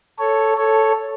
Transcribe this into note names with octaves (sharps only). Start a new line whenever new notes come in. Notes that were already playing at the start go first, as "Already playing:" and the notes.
A4 C#5
A4 C#5